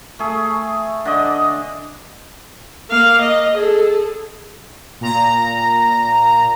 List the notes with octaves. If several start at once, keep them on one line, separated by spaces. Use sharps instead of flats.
A3 G#4
D3 D5 D#5
A#3 F5
D#5
G#4 A4
A#2 A#5